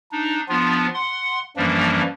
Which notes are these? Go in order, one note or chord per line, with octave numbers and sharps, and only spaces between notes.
D4 D#4
F3 B3 D4 F4
F#5 C6
F#2 E3 F3 G3 A#3 D4